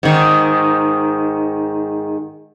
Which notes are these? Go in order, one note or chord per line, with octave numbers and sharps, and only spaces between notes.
G#2 D#3